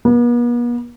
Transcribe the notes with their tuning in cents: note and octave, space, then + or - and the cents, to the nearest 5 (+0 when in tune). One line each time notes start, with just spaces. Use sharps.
B3 -45